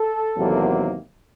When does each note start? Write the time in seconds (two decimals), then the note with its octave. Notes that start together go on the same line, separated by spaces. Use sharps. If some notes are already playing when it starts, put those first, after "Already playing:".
Already playing: A4
0.36 E2 C3 D#3 F#3 A#3